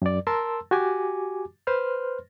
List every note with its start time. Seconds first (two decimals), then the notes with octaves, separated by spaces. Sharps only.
0.02 F#2 D5
0.27 A#4 A5 C6 E6
0.71 F#4 G4 G#5 D6
1.67 B4 C5 C6 F6